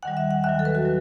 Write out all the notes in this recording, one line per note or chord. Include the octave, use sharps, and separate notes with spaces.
D#2 D#3 G3 F#5
E5
F#5
D#2 D#3 F#3 E5
A4
B4
F#4
F#3